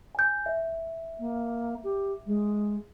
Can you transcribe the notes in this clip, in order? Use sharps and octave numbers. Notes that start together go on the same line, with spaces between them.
G#5 G6
E5
A#3
G4
G#3